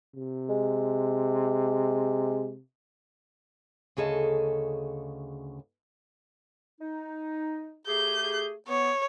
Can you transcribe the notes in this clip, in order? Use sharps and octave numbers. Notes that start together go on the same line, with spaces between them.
C3
G#3
D2 C#3 G#4 A4 D#5
D#4
A3 G4 G#4 G6
B3 C#5